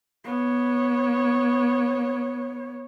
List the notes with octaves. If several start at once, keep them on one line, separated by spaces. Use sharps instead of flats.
B3 C#5